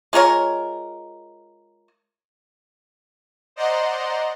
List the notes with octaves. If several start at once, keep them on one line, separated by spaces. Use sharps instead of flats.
G#3 F4 A#4 C#5
C5 D5 D#5 F#5 A#5 C6